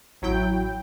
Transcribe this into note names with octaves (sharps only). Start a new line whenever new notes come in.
A1 F#3 E4 G5 G6